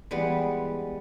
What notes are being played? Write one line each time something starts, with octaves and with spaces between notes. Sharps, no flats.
E3 G3 G#3 B3